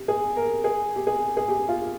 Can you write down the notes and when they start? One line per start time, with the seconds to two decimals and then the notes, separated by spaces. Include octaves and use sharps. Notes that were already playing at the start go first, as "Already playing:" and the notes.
Already playing: G4
0.08 G#4
0.36 A#4
0.64 G#4
0.96 G4
1.07 G#4
1.37 G#4
1.48 G4
1.69 F4